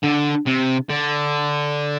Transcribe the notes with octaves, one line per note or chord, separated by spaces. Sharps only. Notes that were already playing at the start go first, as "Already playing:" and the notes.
D3
C3
D3